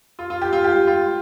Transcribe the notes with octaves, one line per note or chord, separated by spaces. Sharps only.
F4
F4
G4
F4
G4
F4